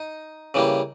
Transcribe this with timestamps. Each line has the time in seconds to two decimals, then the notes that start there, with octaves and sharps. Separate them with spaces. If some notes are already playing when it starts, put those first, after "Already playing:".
Already playing: D#4
0.54 C#3 E3 G3 A#3